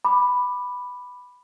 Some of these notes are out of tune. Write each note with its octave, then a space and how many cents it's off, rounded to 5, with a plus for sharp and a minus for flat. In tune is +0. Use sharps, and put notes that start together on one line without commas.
B5 +0 D6 +20